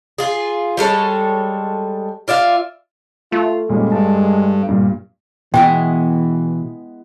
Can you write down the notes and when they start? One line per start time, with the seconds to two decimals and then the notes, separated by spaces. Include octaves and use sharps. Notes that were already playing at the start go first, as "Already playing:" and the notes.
0.18 F4 G#4
0.77 G3 G#3 A4 C#5
2.28 F4 D5 E5 F5
3.32 A3 F4
3.69 A#2 G3 G#3 C#4
3.92 G2 A5
4.69 G2 A#2
5.54 B2 E3 G#3 B3 E4 G5